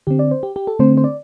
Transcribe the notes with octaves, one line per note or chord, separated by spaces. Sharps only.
D3 C4 G4
D5
C5
G4
G4
A4
D3 A3 C4 C5
C5
D5